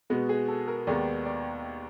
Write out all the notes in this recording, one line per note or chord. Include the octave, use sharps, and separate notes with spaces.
B2 G#3 B3 F#4
G#4
A4
A#4
D#2 D#3 G#3 B3 D5
D5